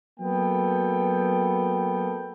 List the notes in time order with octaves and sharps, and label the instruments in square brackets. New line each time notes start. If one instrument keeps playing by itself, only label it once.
[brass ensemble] F#3 A#3 B3 A4 G5